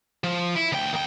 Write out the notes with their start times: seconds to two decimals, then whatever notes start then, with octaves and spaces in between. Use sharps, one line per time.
0.24 F3
0.55 E4
0.72 D2 G5
0.93 D#2 G5